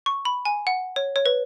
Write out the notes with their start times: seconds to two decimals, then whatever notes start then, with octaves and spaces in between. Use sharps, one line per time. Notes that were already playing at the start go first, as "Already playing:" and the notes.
0.06 C#6
0.25 B5
0.45 G#5
0.67 F#5
0.96 C#5
1.16 C#5
1.26 B4